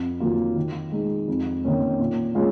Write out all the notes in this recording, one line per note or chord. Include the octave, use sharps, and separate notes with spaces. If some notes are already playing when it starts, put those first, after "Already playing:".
Already playing: F2
D#3 F#3 A#3 F4
D#3
G#3 D#4
F2
D#3 A#3 C#4
A#2
G#3 C#4 F4